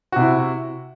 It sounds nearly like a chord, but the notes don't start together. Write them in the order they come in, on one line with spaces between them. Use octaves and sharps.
F#4 C3 E4